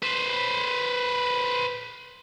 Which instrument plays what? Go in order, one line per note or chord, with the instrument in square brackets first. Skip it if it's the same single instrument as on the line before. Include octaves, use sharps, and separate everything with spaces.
[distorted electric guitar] B4 C5